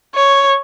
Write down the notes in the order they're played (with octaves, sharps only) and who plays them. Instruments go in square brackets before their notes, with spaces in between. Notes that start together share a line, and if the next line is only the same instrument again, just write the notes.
[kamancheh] C#5